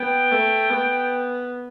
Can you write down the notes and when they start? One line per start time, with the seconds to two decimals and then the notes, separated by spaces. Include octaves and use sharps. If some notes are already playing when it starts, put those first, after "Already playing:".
Already playing: B3 G5
0.31 A3
0.70 B3